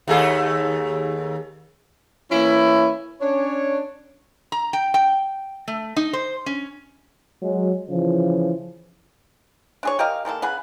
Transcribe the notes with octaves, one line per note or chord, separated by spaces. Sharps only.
D#2 A3 G#4
E3 A#3 C#4 E4
C#4 D4 C#5
A#5
G5
G5
A3
D#4
C5
C#4
F#3 G#3
C#3 E3 F3
D4 G#4 C#5
G4 A#4 D#5 F5
D#3 G#3 A#3 A4
C#3 B3 G#4 B4